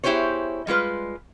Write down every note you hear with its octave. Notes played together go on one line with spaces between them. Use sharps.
B3 E4 G4 G#4 C5 C#5
G3 G#3 F4 B4